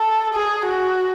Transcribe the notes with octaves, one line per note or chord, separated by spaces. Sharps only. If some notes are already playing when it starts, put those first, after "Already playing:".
Already playing: A4
G#4
F#4